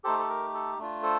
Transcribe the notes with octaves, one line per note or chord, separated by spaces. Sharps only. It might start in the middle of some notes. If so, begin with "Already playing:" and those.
A3 D#4 G4 A4 C5
A4
A#4
A4
A3 D4 F4
A4 C5